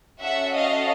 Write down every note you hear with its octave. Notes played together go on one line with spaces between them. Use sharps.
C#4 F#4 A4 E5 F#5
D#5 F5